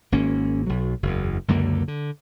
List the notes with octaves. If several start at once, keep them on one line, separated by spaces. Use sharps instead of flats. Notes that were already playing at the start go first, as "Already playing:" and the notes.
G#1 A#3 C#4
B1 F#3
F#1 E2
C#2 F#2 D3 A#3
D3